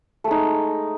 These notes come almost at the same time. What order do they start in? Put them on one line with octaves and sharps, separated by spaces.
A3 G#3 D#4